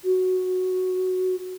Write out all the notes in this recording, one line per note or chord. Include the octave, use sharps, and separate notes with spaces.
F#4